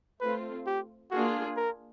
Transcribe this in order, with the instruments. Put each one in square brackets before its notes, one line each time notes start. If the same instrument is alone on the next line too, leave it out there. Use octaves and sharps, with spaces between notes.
[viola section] A3 C4 F4 [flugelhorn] B4
[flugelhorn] G4
[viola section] A#3 D4 F4 G#4 [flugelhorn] F#4
[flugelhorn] A#4